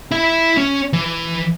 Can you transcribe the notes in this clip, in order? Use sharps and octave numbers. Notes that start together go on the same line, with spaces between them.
E4 E5
C#4
E3